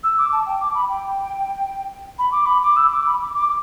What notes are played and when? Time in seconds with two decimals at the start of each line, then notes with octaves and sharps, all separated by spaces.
0.03 E6
0.17 D6
0.32 A5
0.46 G5
0.60 D6
0.74 B5
0.89 G5
2.18 B5
2.31 D6
2.46 B5
2.62 D6
2.76 E6
2.91 D6
3.06 B5
3.20 D6
3.34 D6